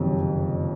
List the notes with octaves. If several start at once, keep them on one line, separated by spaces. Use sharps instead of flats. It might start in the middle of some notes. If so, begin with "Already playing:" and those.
Already playing: F#1 F2 C3 D#3 F#3